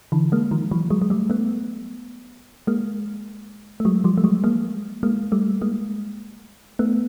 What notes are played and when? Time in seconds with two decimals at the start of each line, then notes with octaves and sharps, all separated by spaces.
0.12 D3 E3
0.32 G#3 A#3
0.51 D#3 F3
0.71 E3 F#3
0.90 F#3 G#3
1.02 G#3
1.10 G3 A3
1.30 A3 B3
2.67 G#3 A#3
3.80 A3
3.85 F#3 G#3
4.04 F3 G3
4.18 A3
4.24 F#3 G#3
4.44 G#3 A#3
5.03 G#3 A#3
5.32 G3 A3
5.62 G#3 A#3
6.79 A3 B3